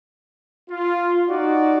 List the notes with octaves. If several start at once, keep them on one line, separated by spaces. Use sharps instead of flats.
F4
D#4 F#4 D5